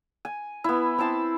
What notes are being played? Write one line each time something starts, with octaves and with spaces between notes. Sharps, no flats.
G#5
B3 E4
C4 E4 A5 C6